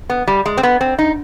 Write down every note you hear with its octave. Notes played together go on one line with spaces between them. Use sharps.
B3
G3
G#3
C4
B3
C4
D#4